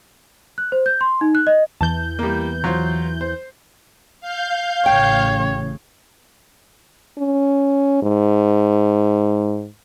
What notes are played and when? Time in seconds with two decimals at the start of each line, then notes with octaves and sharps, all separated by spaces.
0.58 F#6
0.72 C5
0.86 G6
1.01 C6
1.21 D#4
1.35 F#6
1.47 D#5
1.81 E2 E3 A5 G6
2.19 G3 A#3
2.64 F#3 F4 C5
3.21 C5
4.21 F5 G6
4.86 A1 C#3 C#5 G5
7.18 C#4
8.02 G#2